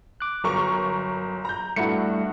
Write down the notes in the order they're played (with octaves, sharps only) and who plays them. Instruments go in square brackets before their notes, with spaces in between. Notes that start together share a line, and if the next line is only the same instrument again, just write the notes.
[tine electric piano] D6 F#6
[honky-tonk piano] G1 A#4 C#6 [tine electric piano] F#3
[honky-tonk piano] A#5 G6
[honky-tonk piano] G2 F#4 C#7 [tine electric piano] G3 A3 E4